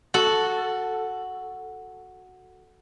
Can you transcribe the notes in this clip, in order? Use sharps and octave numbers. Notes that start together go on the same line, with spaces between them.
F#4 A4